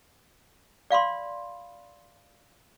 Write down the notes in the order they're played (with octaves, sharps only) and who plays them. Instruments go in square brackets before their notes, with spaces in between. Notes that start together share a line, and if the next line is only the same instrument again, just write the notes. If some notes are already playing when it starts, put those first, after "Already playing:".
[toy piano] D5 F5 B5 C6